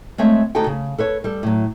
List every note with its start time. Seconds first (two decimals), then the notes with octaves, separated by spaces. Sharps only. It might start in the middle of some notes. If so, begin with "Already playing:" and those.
0.18 G#3 A3 C4 C#5 E5
0.55 D2 D#4 F#4 G4 A4 G5
0.66 C#3
0.98 A4 B4 C#5
1.24 G3 A4
1.43 A2 F#3